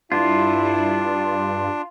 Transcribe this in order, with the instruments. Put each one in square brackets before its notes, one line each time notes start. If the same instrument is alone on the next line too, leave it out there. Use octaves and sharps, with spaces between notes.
[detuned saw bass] G2 [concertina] D4 [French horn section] E4 [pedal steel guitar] F4